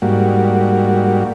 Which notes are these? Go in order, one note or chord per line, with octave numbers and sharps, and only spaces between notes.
G#2 G3 A#3 F#4